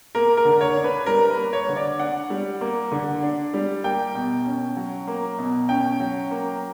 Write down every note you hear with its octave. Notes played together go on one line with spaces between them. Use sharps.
A#3 A#4
A#4
D3
C#5
D4
B4
G3 A#4
B4
A#3
C#5
D3
D5
D4 F#5
G3
A#3
D3
D4
G3
A#3 G5
B2
C#4
F#3
A#3
B2
C#4 G5
F#3
A#3